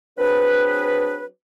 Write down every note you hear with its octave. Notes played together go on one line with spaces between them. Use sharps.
F#3 C4 D4 G#4 B4